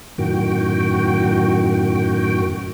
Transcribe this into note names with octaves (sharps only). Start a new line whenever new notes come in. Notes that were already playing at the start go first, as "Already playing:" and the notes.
F#2 A2 D#3 F#4 G5